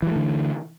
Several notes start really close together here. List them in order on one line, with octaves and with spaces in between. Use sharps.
E3 F#3 A3 D3